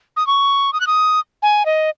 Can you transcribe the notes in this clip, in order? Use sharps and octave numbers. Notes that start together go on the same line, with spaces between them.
D#6
C#6
D#6
F#6
D#6
G#5
D#5